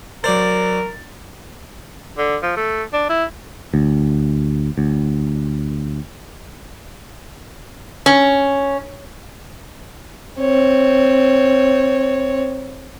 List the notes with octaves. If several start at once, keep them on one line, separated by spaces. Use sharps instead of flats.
F#3 A#4 C5 D5 A6
D3
F3
A3
D4
E4
D2
D2
C#4
C4 C#5